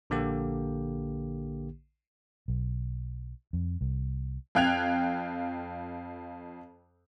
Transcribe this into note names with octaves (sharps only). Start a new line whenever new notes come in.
A#1 D3 A#3 G4
B1
F2
C2
F2 F5 G5 F#6 G#6 F7